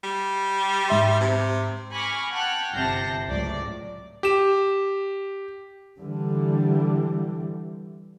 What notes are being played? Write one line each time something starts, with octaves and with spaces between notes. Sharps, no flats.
G3
G#2 E5 C6
C3
G#5 B5 C#6 D6 F6 A#6
F#5 G5 A5 F6 F#6 G#6
G1 C3 A5 G6 A#6 C7
C#2 A2 F#3 D5
G4 E7
D3 E3 G3